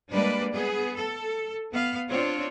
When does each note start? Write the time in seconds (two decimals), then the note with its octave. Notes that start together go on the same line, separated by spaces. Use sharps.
0.11 G3 G#3 A#3 D4 B4 D5
0.52 B3 G#4
0.95 A4
1.71 B3 F5
2.09 C4 D4 F4 C#5